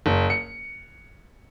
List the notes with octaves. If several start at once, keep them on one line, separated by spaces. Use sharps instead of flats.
F#1
C#7